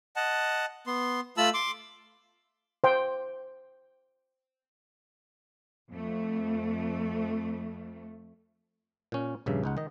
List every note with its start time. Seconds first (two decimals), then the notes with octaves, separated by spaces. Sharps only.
0.16 D#5 F#5 A5
0.87 B3 C6
1.37 A3 F4 A5 B5 E6
1.54 C6 D6
2.84 C5 G5
5.89 F2 A3
9.12 A#2 C#4
9.46 A#1 G2 C#3 E5
9.64 C#2 D#4 F#5
9.77 D#3 D#5